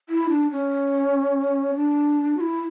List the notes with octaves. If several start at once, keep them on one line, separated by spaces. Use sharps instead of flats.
E4
D4
C#4
D4
F#4
E4